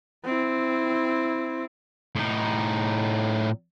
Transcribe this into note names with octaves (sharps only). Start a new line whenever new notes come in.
C4 E4
A2 D#4